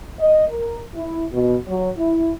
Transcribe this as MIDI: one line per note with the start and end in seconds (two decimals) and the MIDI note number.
0.19 0.47 75
0.49 0.79 70
0.95 1.24 64
1.32 1.55 47
1.67 1.89 54
1.98 2.30 64